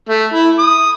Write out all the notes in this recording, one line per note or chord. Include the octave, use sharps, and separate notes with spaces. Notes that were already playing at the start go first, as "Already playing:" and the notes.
A3
E4
D#6